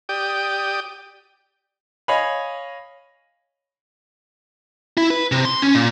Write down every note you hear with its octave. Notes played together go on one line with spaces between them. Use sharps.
G4 D5 G5 D#6
C#5 D#5 F5 G#5 B5
E4
B4
C3
C6
C#4
A#2